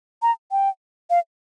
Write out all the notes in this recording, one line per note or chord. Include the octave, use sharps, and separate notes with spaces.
A#5
G5
F5